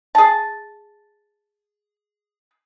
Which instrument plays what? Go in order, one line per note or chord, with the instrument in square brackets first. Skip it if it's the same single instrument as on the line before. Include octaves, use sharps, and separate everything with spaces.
[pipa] G#4 A5